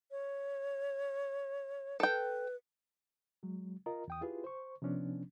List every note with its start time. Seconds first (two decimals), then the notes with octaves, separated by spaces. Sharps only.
0.11 C#5
2.00 A4 B4 G5
3.43 F#3 G#3
3.86 F4 A#4 D#5 A#5
4.08 E2 G5 D#6
4.21 E4 F4 G4 G#4 B4
4.44 C5 C#6
4.82 C3 F3 B3 C#4 D4